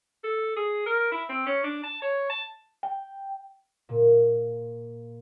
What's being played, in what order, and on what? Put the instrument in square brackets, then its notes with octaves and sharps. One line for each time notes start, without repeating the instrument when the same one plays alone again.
[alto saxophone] A4
G#4
A#4
E4
C4
C#4
D4
A5
C#5
A5
[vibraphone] G5
[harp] A#2